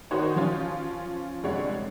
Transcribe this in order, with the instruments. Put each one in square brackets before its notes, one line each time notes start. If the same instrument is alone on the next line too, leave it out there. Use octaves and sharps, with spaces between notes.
[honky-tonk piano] D#3 D#4 F#4 C5 C#5
F3 C#4 F4
F1 D3 G3 G#3 C#5 F#5